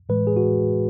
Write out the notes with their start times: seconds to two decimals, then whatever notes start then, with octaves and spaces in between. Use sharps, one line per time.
0.09 A2 E3 G#3 B4
0.27 G#4
0.37 F#4